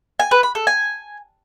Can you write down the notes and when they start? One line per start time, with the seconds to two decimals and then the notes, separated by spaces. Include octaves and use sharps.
0.19 G#5
0.31 B4
0.43 B5
0.55 A4
0.67 G#5